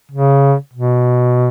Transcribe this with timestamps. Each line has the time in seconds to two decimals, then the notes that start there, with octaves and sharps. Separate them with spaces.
0.12 C#3
0.73 B2